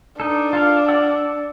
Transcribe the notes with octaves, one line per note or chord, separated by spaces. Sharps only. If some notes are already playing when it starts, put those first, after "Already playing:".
D4 D#4 A4
F4 A4 F5
D5 F#5 E6